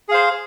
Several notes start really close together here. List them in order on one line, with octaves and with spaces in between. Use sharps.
G#4 F5 C5